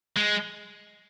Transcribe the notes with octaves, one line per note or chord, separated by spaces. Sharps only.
G#3